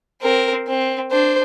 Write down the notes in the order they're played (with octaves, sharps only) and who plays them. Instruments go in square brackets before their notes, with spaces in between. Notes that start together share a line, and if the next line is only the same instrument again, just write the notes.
[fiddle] C4 [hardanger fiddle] A#4
[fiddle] C4
[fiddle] D4 [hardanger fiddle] C5